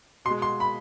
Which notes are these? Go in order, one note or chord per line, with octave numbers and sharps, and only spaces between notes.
B2 C6
G#3
C6
B5